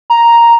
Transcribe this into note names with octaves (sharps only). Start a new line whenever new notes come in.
A#5